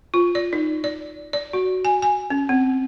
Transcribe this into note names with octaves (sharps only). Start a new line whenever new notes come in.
F4
D5
D#4
D5
D5
F#4
G#5
G#5
C#4
C4